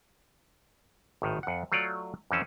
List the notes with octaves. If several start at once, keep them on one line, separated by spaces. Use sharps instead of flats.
G#1 A2 D#3
F2 F#5
F#3 A3 F4 C#5 D5
F2 E3 C4 C#4 A5